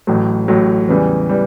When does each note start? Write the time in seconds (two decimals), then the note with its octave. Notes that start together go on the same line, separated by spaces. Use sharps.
0.07 A1 A2 F#3
0.48 A1 A2 F#3
0.88 E2 C#3 E3 G3
1.29 E3 G3